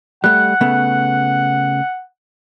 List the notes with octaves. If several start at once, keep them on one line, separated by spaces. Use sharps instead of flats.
G3 A3 F#5 F#6
C#3 A3 B3